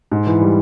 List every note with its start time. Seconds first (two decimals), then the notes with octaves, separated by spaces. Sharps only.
0.11 G#2
0.27 E3
0.41 G3